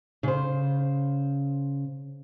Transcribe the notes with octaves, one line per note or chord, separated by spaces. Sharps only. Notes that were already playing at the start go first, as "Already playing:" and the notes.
C#3 C5